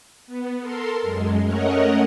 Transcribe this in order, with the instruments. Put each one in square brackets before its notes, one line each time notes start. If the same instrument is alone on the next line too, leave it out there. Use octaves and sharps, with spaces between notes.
[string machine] B3
A4 A#4 C6
F#2 G#3
A3 C#4 A#4 C#5 D#5 F#5